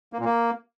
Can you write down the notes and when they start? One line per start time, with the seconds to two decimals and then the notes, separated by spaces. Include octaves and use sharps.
0.13 A#3
0.19 A#2
0.25 A#3